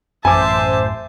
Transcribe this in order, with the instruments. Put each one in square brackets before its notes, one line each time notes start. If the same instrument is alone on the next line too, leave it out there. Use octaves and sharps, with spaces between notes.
[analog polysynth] A1 C5 [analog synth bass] F#2 [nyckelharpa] E5 A5 [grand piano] G#5 D6